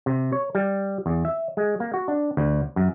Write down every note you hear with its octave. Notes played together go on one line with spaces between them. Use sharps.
C3
C#5
G3
E2
E5
G#3
A#3
F#4
D4
D2
F#2